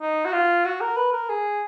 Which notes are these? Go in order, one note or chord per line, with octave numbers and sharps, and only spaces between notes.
D#4
F#4
F4
F#4
A#4
B4
A#4
G#4